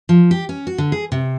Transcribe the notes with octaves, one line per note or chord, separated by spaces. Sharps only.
F3
G4
C#4
F#4
D3
G#4
C3